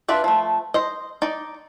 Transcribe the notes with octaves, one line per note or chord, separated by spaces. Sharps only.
D4 F4 B4 D5 E5
F3 A3
C5 D#5
D#4 D5